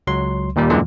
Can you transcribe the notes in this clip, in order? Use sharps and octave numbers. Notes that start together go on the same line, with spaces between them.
C#2 F#3 C6
D#2 A#2 G3
F#2 A#2 D3 E3 G#3